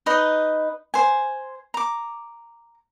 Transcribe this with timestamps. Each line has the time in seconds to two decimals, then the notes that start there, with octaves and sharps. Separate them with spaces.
0.06 D#4 B4 D#5
0.94 C5 G#5
1.74 A#5 D6